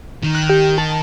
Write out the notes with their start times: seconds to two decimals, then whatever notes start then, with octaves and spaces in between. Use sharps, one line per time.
0.23 D#3
0.35 F#6
0.50 G4
0.78 A5